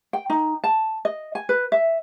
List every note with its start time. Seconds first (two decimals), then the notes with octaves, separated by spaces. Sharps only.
0.13 G5
0.30 D#4
0.64 A5
1.05 D#5
1.35 G#5
1.49 B4
1.72 E5